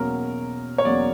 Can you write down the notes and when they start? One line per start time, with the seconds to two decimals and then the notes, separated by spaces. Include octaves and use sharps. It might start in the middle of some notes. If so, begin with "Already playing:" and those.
Already playing: E2 B2 F#3 A#3 C#4 A#4
0.78 C#5
0.85 E2 B2 F#3 A#3 C#4 D5